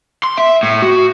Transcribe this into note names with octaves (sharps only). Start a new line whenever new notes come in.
C6
E5
A2
F#4